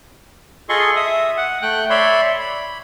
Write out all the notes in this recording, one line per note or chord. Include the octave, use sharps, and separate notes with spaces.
F4 G#4 A4 D#5 C6 C#6
E5 D#6
F#5
A3 G5 F#6
C#5 D5 E5 B5 C6
B5